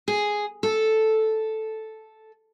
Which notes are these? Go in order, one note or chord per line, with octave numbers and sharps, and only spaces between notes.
G#4
A4